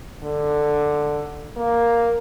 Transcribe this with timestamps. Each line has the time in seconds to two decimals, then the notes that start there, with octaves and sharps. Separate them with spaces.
0.23 D3
1.56 A#3